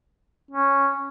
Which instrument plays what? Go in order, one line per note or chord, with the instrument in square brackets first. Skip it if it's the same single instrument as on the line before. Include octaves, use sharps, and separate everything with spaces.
[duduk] C#4